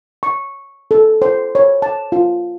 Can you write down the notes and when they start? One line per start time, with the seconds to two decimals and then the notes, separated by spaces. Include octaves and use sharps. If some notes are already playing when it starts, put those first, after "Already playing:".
0.23 C#6
0.91 A4
1.22 C5
1.55 C#5
1.82 A5
2.12 F4